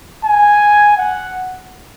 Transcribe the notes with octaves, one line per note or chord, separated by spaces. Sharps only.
G#5
F#5